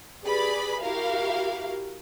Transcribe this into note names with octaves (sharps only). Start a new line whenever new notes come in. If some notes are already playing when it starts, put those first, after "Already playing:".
G4 G#4 B4 D5 B5
E4 F#4 G4 A#4 F5